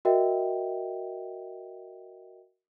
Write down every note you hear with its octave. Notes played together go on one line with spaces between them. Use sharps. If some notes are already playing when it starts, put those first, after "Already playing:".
F#4 A#4 D#5 E5 G5